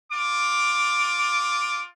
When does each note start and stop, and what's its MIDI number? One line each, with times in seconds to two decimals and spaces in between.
0.12 1.84 65
0.12 1.84 86